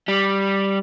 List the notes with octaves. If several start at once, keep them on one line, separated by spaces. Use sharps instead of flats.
G3